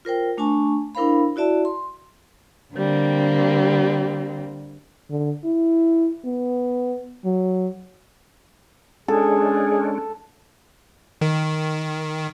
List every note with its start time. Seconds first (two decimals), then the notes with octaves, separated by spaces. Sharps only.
0.05 F4 A#4 C5 G5
0.37 A3 D4 G#5 A5 C#6
0.95 D4 E4 A#4 C5 F5 B5
1.36 E4 F#4 D5 E5 A5
1.65 C6
2.74 D3 G3 A#3 C4
5.10 D3
5.44 E4
6.25 B3
7.25 F#3
9.08 G#3 C#4 D4 G#4 A4
11.21 D#3